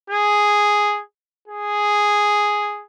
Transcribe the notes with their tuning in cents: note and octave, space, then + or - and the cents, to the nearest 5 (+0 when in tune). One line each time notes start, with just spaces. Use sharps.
G#4 +0
G#4 +0